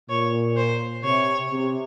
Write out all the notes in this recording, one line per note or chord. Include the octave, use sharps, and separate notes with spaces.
A#2 C#5
C5
C3 C#5
C3